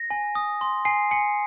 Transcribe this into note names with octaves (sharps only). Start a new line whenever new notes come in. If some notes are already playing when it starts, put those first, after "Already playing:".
Already playing: A#6
G#5
D#6
C6
G#5 C7
G#5 C#7